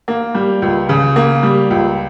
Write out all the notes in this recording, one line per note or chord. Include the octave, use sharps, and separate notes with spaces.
A#3
G3
C#2
C#3
A#3
G3
C#2